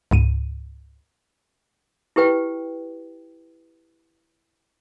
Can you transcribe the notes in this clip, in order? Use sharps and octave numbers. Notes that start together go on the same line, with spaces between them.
C#2 G#2 D#7
E4 G4 B4 G5